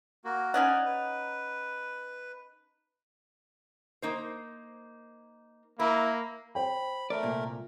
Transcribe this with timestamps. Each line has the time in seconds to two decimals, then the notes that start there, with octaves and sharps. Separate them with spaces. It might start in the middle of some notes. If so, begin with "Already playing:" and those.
0.25 A#3 F#4
0.54 C#4 D#4 D5 F#5 G#5
0.85 B4
4.02 A#3 D#4 C5
5.80 A#3 E4 A#4
6.55 C5 G5 B5
7.10 A3 A#4 D5
7.23 C2 A#2